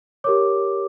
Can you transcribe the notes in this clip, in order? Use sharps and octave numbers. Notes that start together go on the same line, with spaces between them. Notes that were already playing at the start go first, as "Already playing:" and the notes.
G4 A#4 C#5 D6